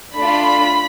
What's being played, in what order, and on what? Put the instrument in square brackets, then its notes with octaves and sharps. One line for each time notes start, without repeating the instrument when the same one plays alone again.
[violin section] A3 D4 F4 B5